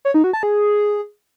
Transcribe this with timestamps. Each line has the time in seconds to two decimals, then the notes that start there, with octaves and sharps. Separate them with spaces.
0.05 C#5
0.14 D#4
0.24 F#4
0.33 A5
0.43 G#4